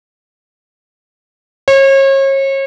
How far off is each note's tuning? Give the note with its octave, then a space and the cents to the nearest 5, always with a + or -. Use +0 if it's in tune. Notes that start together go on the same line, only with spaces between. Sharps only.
C#5 -35